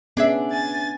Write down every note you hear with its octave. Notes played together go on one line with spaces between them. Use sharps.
B3 C#4 D4 G#4 E5
G#5 A6